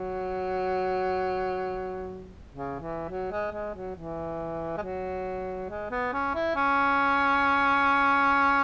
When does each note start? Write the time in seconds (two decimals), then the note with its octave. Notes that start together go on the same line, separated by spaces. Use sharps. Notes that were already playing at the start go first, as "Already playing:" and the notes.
Already playing: F#3
2.52 C#3
2.80 E3
3.09 F#3
3.31 G#3
3.52 G#3
3.75 F#3
3.96 E3
4.77 G#3
4.82 F#3
5.70 G#3
5.91 B3
6.13 C#4
6.35 E4
6.56 C#4